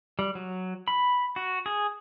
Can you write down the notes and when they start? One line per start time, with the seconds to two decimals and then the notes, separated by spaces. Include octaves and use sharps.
0.19 G3
0.35 F#3
0.88 B5
1.36 F#4
1.66 G#4